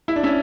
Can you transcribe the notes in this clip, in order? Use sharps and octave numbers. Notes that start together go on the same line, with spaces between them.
E4
D4
C#4 E4